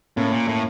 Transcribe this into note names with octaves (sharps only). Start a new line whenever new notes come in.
A2 A#3 C#4
A#2
A2